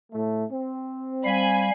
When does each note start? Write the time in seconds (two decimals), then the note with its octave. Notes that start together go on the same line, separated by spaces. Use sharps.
0.12 A2 A3
0.50 C4
1.25 G3 F5 G#5 B5